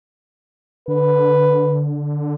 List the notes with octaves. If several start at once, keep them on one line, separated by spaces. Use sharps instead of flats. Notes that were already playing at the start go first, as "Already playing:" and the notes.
D3 B4